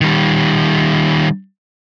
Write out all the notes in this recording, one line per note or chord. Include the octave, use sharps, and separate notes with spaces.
D#3 G3